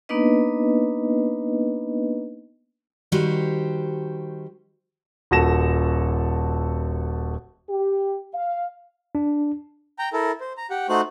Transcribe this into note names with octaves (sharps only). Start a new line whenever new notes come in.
A#3 B3 D4 D#4 B4 D#5
D#3 G3 F#4 G4 C5
D#1 F#4 A4 A#6 E7
G4
F5
D4
G5 A#5
E4 A4 A#4
C5
A#5
G4 F#5
A3 D#4 F#4 C5 F#6